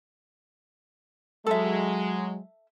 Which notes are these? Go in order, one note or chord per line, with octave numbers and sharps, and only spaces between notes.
F#3 G#3 A4 E5